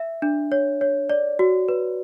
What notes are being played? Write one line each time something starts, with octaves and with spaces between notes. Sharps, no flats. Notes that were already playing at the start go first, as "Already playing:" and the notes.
Already playing: E5
D4
C#5
C#5
D5
F#4
B4